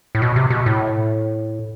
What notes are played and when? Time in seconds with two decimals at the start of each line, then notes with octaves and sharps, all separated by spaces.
0.15 A2
0.22 B2
0.36 C3
0.50 B2
0.66 A2